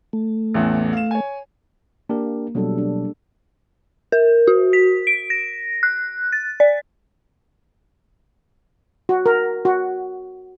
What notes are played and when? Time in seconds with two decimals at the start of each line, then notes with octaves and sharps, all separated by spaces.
0.13 A3
0.54 A1 E2
0.93 F5 E7
1.11 C#5 G#5
2.09 A#3 D4 G4 A#4
2.55 B2 F#3 G3 D4 A4
2.78 D4
4.12 A#4
4.48 F#4
4.73 B6
5.07 D7
5.30 A#6
5.83 F#6
6.32 A6
6.60 D5
9.09 F#4
9.26 A#4
9.65 F#4